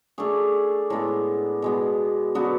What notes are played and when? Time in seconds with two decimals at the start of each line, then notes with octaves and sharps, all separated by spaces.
0.18 A3 D4 G#4 C#5
0.90 A2 G#3 B3
1.62 B2 G#3 B3
2.35 D3 F#3 B3 F#4